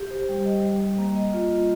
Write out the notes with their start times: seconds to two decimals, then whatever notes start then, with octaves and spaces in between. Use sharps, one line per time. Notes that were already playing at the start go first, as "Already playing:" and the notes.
Already playing: G4
0.10 C5
0.29 G3
0.45 D#5
0.63 G3
0.80 G3
0.99 A#3
1.16 D#5
1.33 F4
1.51 F4